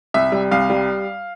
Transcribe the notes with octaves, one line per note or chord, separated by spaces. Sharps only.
C2 E5
G3
C2 F5
G3